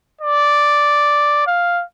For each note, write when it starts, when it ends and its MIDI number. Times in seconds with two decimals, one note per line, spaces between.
0.21 1.45 74
1.47 1.83 77